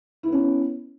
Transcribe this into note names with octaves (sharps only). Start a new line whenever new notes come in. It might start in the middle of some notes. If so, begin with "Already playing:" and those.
B3 C#4 E4